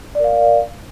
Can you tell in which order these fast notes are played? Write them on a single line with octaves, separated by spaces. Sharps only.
D5 A#4 F5